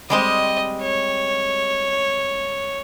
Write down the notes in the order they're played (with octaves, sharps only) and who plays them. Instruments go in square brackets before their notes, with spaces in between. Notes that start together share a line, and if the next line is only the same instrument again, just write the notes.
[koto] G3 G#3 C4 [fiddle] D#5
[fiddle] C#5